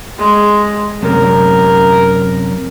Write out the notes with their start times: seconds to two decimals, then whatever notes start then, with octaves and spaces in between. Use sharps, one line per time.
0.18 G#3
1.02 F#2 C3 A#4